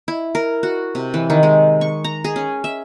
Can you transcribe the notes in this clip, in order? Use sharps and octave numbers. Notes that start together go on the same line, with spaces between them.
E4
A#4
F#4
C3
E3
D#3
G#3
C#6
A#5
G#4
C#4
E5